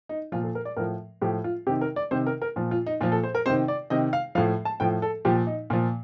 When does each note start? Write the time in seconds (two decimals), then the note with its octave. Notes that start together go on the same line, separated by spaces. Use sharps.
0.09 D#4
0.32 A#2 F3 F4
0.43 A4
0.55 A#4
0.65 D5
0.76 A2 F3 A#4
1.22 A2 F3 G4
1.44 F4
1.67 C3 D#3 G4
1.81 A#4
1.96 D5
2.11 C3 D#3 C5
2.27 A#4
2.42 A#4
2.56 A#2 F3
2.71 F4
2.86 D#4
3.01 A#2 F3 F4
3.12 A4
3.23 C5
3.35 A#4
3.46 C3 D#3 C5
3.68 D5
3.90 C3 D#3 D#5
4.13 F5
4.35 A2 F3 F5
4.65 A5
4.80 A2 F3 G5
5.02 A4
5.25 A#2 F3 G4
5.47 D#4
5.70 A#2 F4
5.73 F3